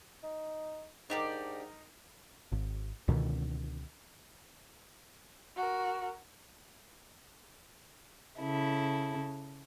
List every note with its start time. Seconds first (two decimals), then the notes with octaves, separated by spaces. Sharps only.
0.23 D#4
1.10 G#2 D4 D#4 G4 A#4 D5
2.52 G#1
3.08 C#2 B2 D3 D#3
5.57 F#4 A#4
8.38 C#3 E4 A4